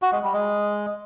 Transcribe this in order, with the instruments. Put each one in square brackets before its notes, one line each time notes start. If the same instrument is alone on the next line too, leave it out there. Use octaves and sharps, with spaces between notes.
[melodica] F#4
G#3
G3
G#3